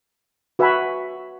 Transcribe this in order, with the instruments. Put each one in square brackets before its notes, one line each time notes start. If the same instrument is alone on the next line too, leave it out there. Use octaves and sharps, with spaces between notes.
[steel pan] F#4 B4 E5 G#5 B5